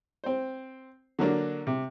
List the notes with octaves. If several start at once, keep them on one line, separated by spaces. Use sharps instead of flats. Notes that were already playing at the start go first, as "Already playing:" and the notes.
C4 C5
D3 F#3 A#3 D4
C3